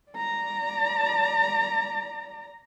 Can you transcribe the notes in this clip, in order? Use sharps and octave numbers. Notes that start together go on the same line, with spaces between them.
D5 A#5